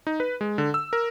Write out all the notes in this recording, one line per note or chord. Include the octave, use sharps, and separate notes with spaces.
D#4
B4
G#3
D3
E6
A#4